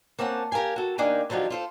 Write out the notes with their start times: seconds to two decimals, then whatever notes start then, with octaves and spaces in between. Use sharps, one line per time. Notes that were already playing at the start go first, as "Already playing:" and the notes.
0.19 A#3 C4 C#4 F#5 A5
0.52 G4 A#4 C5 F5 G#5
0.76 F#4 A4
0.98 D#2 A#3 D4 D#4 G5 G#5
1.30 D3 F3 F#3 D#4 G4
1.50 F4 A4 C5